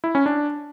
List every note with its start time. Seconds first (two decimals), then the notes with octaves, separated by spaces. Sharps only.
0.04 E4
0.15 C#4
0.26 D4